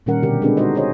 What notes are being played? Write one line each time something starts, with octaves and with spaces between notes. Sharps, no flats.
A#2 D#3 G3 C#4 A#4 F#5
B2 D3 G4 A#4
G#3 C4 D4 G4 A4 B4
G#3 D#4 F#4 C5 D#5
F#4 G#4 C5 C#5 D#5